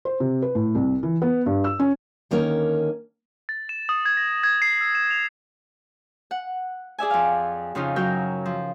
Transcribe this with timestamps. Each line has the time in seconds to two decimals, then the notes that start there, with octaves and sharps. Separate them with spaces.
0.05 C5
0.20 C3
0.42 B4
0.55 A2
0.75 C2
1.03 E3
1.22 B3
1.46 G2
1.64 E6
1.80 C#4
2.31 D3 D#3 A#3 C#4 A#4 C#5
3.49 A6
3.69 E7
3.89 D#6
4.06 G#6
4.17 A#6
4.43 G#6
4.62 C7
4.81 E6
4.95 E7
5.11 F7
6.31 F#5
6.99 G#4 D5 E5 G#5
7.10 F2 F5
7.75 F2 C#3 C#4 D#4 F4
7.96 F#2 F#3 A#4 G5
8.45 F3